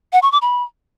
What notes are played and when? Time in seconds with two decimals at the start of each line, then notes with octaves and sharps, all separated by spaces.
0.13 F#5
0.22 C#6
0.32 D6
0.42 B5